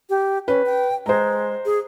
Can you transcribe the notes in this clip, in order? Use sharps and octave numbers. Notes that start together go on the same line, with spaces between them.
G4
C#4 B4
G5
G#3 C5 A#5
G#4